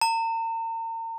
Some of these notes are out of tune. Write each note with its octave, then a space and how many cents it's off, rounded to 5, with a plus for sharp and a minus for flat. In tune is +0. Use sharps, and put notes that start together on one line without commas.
A#5 -40